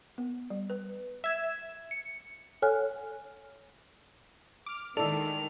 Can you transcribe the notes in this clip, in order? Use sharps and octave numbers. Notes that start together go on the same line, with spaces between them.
B3
G3
B4
E5 G#6 E7
C#7
A4 C#5 F#5 G#5 F6 F#6
D6 F6
D#3 G#3 E4 A4 D5 F7